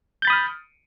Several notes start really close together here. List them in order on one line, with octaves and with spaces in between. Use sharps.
G6 A6 B5 D#6 F6